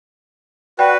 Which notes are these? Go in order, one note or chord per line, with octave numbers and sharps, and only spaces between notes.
F#4 B4 D5 G5